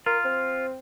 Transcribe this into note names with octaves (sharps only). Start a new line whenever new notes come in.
F4 A#4
C4